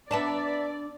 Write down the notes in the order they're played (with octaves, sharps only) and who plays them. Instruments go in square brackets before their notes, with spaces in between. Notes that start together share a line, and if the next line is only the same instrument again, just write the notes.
[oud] B3 D4 [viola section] D5 [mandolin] E5 A5 A#5